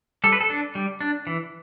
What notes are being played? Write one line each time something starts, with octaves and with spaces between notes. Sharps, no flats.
G3 A4
B4
A4
D4
G3
D4
E3